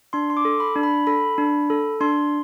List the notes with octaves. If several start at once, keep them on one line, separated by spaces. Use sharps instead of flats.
D4 C6
C6
D6
A4
B5
D4
B5
A4 B5
D4
A4
D4 C6